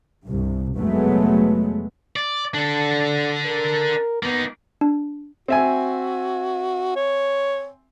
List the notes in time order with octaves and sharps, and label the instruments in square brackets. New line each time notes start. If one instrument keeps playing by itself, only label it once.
[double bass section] C2 G2
F1 F#3 G#3 A3 B3
[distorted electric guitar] D5
[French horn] D3 [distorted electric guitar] D4 A4
[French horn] A#4
[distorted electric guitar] A#3 D#4 [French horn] B3
[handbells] D4
[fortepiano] C4 E5 G#5 [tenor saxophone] F#4
[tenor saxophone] C#5